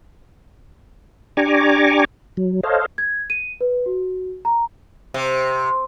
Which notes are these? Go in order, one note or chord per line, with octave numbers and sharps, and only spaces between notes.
D4 G4 G#5 A#5 C#6 D6
F#3
A4 C5 C#5 D#5 F5
G#6
D#7
B4
F#4
A#5
C3